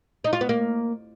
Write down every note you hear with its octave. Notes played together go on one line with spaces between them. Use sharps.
D#4
F4
B3
A#3